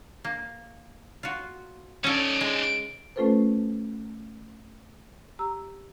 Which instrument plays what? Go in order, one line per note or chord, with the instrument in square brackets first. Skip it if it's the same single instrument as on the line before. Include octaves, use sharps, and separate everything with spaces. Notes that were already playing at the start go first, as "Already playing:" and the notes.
[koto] A#3
F4 F#4
[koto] C#4 A4 [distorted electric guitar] D#4 D5
[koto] G#3
[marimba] A3 C#4 F4 A4 B4 C5
G4 A#5 E6